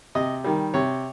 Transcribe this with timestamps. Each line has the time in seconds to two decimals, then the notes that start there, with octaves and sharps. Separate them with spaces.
0.15 C3 D#5
0.44 D#3 G3
0.74 C3 C#5